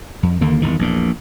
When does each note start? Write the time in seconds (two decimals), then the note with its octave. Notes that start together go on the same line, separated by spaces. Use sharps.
0.23 F2
0.41 D#2 D3 A#3
0.62 G1 E2 D#3
0.79 A#1 E2 A#2